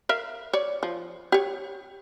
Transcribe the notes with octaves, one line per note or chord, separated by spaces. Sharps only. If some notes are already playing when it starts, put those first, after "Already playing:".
A#4 E5 F5
C#5 D5
F3
G4 C#5